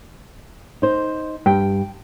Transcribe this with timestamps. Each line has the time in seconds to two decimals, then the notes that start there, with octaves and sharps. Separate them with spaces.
0.82 D#4 C5
1.46 G2 G5